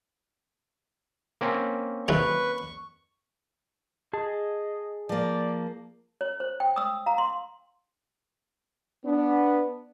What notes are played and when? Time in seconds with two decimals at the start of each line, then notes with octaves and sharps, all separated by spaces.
1.41 A#3 C4 C#4
2.08 B1 C3 D#3 B4 C#6
4.13 G#4 D#5 A5
5.09 F3 A#3 D5
6.21 C#5
6.40 C5
6.60 G5
6.76 D#6 E6
7.06 F5 A#5
7.18 C6
9.06 B3 D4